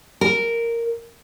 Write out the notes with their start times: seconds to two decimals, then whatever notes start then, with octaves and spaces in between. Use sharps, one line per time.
0.21 A#4